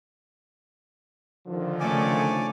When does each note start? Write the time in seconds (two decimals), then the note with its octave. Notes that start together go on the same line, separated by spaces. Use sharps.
1.47 D3 D#3 F3
1.80 C#3 A3 C#5 D5 G#5 D6